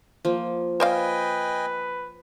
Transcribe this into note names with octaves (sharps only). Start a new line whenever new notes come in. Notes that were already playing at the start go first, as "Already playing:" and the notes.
F3 A#3
B4 C5 D5 D#5 F5 G5 G#5